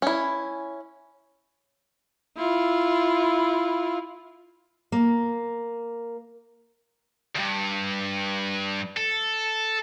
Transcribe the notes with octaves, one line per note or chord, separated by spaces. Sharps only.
C#4 E4
E4 F4
A#3
D2 G2
A4